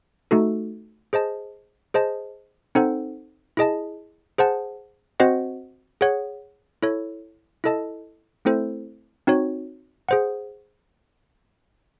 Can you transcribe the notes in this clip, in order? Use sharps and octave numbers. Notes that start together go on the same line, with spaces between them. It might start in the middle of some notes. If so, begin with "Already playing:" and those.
A3 D#4 F#4 A4
G#4 C5 D#5 A5
G#4 C5 D#5 A5
C4 D#4 A4 C5 F#5
E4 G#4 D#5 A5
G#4 C5 F#5 A5
C4 F#4 C5 D#5 F#5
G#4 C#5 F#5
E4 A4 C#5
E4 A4 D#5 A5
A3 C4 E4 A4 C5
C4 D#4 F#4 C#5
G#4 C5 F#5